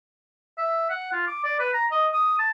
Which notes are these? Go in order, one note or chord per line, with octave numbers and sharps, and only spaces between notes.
E5
F#5
F4
D6
D5
B4
A#5
D#5
D#6
A5